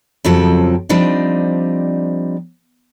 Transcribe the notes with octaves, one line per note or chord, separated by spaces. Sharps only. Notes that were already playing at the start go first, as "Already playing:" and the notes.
F2 C#3 F3 F#3 C4 A4
F3 G3 C4 D4 D#4